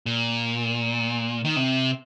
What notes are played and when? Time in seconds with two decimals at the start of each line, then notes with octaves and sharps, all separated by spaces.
0.06 A#2
1.45 D#3
1.56 C3